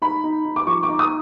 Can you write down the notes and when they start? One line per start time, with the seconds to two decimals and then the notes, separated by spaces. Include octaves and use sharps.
0.02 D#4 B5
0.24 D#4
0.45 D#4
0.56 D6
0.67 F3 C#6
0.83 D6
0.89 D#4
0.99 D#6